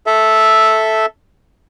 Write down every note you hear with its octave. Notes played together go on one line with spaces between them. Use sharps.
A4 E5